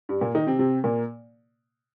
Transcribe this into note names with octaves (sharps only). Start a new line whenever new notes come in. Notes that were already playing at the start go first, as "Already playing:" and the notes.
G2 G3
A#2 A#3
D#3 D#4
C3 C4
C3 C4
A#2 A#3